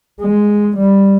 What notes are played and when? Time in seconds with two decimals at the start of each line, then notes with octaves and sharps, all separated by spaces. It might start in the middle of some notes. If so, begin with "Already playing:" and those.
0.21 G#3
0.77 G3